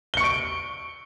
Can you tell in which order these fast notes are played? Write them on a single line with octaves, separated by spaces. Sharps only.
G7 C#7 C#6 D7